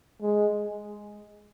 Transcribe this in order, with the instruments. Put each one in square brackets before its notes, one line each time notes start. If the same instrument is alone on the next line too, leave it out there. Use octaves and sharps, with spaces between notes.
[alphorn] G#3